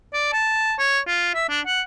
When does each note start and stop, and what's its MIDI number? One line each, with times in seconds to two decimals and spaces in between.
0.14 0.32 74
0.33 0.74 81
0.79 1.00 73
1.08 1.33 65
1.35 1.47 76
1.49 1.61 62
1.67 1.81 78